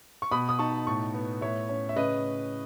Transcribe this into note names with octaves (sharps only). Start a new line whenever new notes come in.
C#6
B2 B5 D#6
D#6
D#4 A5 C#6
A2 A5 C#6
B3
A2 C#5 E5
C#4
E5
C#3 B4 D#5